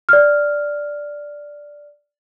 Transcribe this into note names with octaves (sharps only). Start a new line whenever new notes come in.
D5 F6